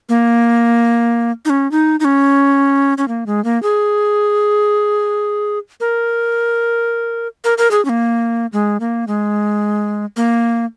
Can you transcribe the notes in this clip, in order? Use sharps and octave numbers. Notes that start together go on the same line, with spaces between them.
A#3
D#4
C#4
D#4
D#4
C#4
C#4
A#3
G#3
A#3
G#4
A#4
A#4
A#4
G#4
C#4
A#3
G#3
A#3
G#3
A#3